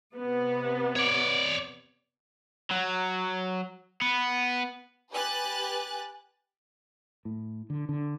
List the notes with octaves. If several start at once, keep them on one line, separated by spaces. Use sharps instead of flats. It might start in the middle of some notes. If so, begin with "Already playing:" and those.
C3 B3
C#5 D5
F#3
B3
G4 B4 G#5 F#6 A6
A2
D3
D3